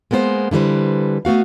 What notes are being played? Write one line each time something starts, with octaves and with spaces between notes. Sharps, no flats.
G#3 A#3 B3 A4 C5
D3 E3 G3 B4 C5
A3 B3 F#4 F5